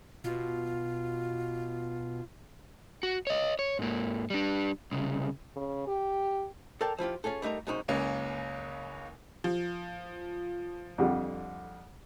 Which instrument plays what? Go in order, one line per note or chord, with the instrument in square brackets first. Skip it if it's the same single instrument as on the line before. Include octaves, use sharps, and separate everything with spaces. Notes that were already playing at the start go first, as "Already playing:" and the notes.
[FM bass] B2 [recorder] F4
[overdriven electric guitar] F#4
C#5 D#5
C#5
G#2 A#3
G3 D4
C2 C#3
[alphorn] C#3
G4
[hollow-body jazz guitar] A4 A#4 D5 F5 G5 A5
F3 E4 F4 G4
C#4 F4 G#4 A4
G3 A3 D#4 A#4 A#5
F#2 C3 G#3 D#4 F#4
[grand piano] F#1 C#2 A#3 C#4
[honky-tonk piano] F3
[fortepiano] F2 D3 G3